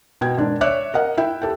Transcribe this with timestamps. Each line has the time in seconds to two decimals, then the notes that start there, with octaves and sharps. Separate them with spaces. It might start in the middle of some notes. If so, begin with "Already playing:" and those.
0.21 B2 G5 G#6
0.37 G#2 D#3 D4
0.61 C#5 D5 E5 D6 F#6
0.94 A#4 D#5 F#5
1.17 E4 E5 G5
1.42 G4 A4 G5